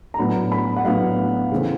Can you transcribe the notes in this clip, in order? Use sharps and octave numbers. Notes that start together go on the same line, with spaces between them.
A#5
A2 F#3 B3 D4 B5
B5
F#5
A2 F#3 B3 D4 F5
C#3 E3 A3 C4